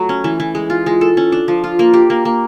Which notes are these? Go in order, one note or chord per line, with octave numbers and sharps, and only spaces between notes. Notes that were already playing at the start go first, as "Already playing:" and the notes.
Already playing: F#3 A3
C#4
E3
E3
G#3
F4
G#3
A4
C#4
D4
F3
F4
A#3
G4
A#3
A#3